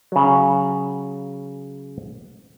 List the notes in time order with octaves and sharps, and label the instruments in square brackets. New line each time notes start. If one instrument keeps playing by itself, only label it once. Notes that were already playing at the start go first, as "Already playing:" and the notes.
[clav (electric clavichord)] C#3 F#3